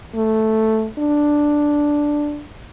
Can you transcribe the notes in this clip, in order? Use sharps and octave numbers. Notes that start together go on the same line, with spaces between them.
A3
D4